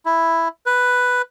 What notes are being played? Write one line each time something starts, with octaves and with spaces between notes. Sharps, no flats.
E4
B4